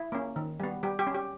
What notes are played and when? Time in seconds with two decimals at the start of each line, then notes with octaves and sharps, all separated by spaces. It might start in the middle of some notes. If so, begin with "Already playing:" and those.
Already playing: E4
0.12 A#3 C#4
0.36 D#3
0.60 G3 B3
0.83 G3 G4
0.99 G4
1.07 C#4
1.15 G4